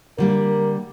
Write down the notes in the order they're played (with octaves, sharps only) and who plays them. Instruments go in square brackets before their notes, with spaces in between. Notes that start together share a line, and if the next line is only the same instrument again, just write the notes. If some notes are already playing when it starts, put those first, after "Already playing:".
[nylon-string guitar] D3 G3 A#3 [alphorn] A#4